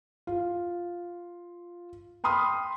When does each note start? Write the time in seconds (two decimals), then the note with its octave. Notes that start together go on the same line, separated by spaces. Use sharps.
0.27 F4
2.24 G5 B5 C6 D#6 F6